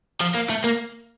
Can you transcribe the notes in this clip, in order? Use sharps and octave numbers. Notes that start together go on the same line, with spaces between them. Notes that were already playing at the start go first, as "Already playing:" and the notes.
F3
A#3
A3
A#3